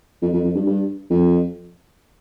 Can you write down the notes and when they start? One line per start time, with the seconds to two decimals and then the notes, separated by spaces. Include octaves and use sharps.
0.22 F2
0.33 F2
0.44 F2
0.55 G2
0.66 G2
1.10 F2